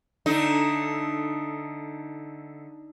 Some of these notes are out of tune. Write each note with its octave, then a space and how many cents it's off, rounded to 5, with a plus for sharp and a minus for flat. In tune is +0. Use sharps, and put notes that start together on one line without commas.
D3 +0 A3 -10 D#4 +0